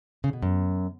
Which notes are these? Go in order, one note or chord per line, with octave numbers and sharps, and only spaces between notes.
C#3
B2
F#2